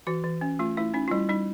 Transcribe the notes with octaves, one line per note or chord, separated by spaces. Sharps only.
E3 F#4
E3
C#4
A3 F4
A3 E4
C#4 D#4
F4
G3 E4
G3 D#4